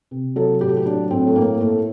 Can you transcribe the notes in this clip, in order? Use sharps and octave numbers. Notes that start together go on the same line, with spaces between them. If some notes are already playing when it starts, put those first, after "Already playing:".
C3
F#3 A4
A2 G4
A4
G4
F#3 D4
A2 C4
A3
A2 A#3
A2 A3